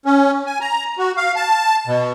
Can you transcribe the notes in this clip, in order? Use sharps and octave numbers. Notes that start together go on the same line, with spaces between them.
C#4
G#5
A#5
F#4
F5
A5
B2